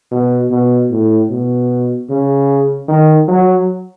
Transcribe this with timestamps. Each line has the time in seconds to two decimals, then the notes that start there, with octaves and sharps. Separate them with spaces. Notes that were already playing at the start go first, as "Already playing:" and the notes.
0.11 B2
0.51 B2
0.91 A2
1.30 B2
2.09 C#3
2.88 D#3
3.28 F#3